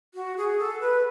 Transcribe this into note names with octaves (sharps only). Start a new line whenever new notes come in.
F#4
G#4
A4
B4